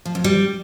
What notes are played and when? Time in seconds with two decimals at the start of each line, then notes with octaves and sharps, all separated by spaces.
0.05 F3
0.15 F2
0.24 G3